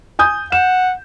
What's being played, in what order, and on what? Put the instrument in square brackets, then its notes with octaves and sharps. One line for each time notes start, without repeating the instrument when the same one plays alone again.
[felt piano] G#5 D#6 G6
[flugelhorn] F#5 [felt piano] E7